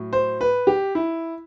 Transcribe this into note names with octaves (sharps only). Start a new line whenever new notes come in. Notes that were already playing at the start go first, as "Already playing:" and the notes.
Already playing: A2 F#3
C5
B4
G4
E4